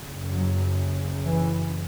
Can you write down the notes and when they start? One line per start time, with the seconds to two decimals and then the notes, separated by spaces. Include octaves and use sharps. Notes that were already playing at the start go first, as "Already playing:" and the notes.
Already playing: F#1 F#2 C#3
0.32 F#3
1.24 E3